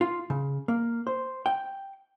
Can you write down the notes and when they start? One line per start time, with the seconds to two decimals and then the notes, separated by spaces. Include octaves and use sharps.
0.01 F4
0.30 C#3
0.68 A#3
1.07 C5
1.46 G5